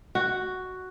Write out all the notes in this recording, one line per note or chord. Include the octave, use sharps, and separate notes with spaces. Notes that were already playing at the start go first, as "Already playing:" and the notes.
F#4